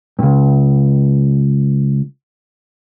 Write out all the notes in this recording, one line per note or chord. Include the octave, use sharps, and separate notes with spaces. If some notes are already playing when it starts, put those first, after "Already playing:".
C#2 G2